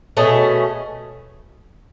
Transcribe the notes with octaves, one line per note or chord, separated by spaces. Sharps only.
B2 A3 C#4 G#4